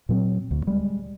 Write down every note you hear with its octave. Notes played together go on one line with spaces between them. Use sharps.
A#2 F#3 C4
D2
G3 G#3